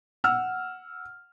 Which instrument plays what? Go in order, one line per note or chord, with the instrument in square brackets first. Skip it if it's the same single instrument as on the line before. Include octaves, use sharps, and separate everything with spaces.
[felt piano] F#5 E6 F6